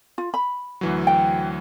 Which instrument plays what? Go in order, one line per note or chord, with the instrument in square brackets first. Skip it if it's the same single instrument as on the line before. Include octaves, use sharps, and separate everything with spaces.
[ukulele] F4
B5
[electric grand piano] D2 E3 F#3
[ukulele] G5